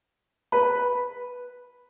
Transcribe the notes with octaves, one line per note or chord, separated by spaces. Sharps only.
B4 B5